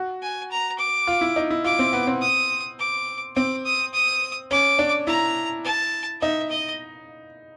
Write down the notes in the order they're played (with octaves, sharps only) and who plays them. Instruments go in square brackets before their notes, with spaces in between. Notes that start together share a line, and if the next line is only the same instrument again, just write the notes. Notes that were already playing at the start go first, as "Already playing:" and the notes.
Already playing: [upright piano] F#4
[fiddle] G#5
A#5
D6
[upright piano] F4
E4
D#4
E4
[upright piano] F4 [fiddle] D6
[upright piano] C4
B3
C4
[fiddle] D#6
D6
[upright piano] C4 [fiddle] D6
[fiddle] D#6
D#6
[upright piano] C#4 [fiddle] D6
[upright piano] D4
[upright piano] E4 [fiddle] A#5
[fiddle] A5
[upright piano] D#4 [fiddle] E5
[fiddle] D#5